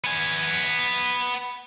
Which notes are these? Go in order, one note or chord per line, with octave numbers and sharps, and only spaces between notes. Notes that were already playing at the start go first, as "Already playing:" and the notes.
B3 G#5